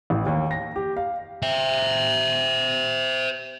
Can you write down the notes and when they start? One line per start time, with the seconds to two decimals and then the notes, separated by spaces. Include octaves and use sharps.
0.10 A1
0.26 D#2
0.51 A#6
0.76 G4
0.96 F5
1.43 C5 E5